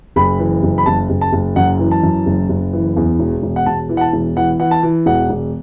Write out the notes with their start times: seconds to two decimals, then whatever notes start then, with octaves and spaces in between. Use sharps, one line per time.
0.16 F#1 B5
0.39 E3
0.63 F#1
0.78 B5
0.86 F#1 A5
1.10 F#1
1.21 A5
1.33 F#1
1.56 F#2 F#5
1.79 E3
1.91 A5
2.03 F#2
2.26 F#1
2.49 F#1
2.73 E3
2.97 E2
3.19 E1
3.43 E1
3.56 F#5
3.66 E1 A5
3.89 E3
3.97 F#5
4.01 A5
4.13 E1
4.37 E3 F#5
4.60 E3 F#5
4.71 A5
4.83 E3
5.06 E1 F#5
5.30 E1